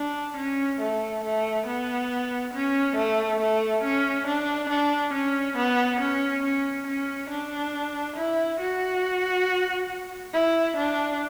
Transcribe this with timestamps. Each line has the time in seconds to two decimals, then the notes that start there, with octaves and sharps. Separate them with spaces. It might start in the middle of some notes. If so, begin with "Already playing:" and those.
Already playing: D4
0.37 C#4
0.81 A3
1.24 A3
1.67 B3
2.54 C#4
2.96 A3
3.40 A3
3.83 C#4
4.27 D4
4.70 D4
5.14 C#4
5.57 B3
6.00 C#4
6.43 C#4
6.87 C#4
7.30 D4
8.16 E4
8.60 F#4
10.33 E4
10.77 D4